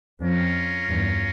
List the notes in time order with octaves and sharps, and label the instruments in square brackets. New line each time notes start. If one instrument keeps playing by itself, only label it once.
[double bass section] F2 [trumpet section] C#4 F4 A#4
[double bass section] E2 G2